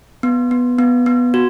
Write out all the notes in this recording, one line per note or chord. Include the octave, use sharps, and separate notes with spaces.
B3
B3
B3
B3
F#4